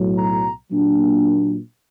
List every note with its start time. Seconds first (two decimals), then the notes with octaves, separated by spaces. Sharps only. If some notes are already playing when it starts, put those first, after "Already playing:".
Already playing: B1 A2 F#3
0.17 A#5
0.70 A#2 F#3 A#3 D4